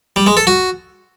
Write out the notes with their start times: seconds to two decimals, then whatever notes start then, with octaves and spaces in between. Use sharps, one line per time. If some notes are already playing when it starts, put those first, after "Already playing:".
0.16 G3
0.27 G#3
0.37 A4
0.47 F#4